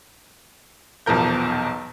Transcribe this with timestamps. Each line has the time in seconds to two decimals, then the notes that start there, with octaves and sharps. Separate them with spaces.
1.06 D#1 B1 E2 F3 A#4 G6